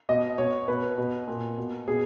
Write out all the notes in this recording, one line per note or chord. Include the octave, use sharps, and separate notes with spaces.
B2 D#5
B2 C#5
B2 B4
B2
A#2
B2
B2 G#4